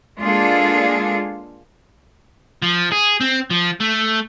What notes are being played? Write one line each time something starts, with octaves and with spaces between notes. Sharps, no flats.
G#3 A#3 D4 F4 G#4 A4
F3
G#4
C4
F3
A3